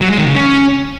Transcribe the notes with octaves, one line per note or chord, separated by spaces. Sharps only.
F#3
G#3
D#3
C#3
C#4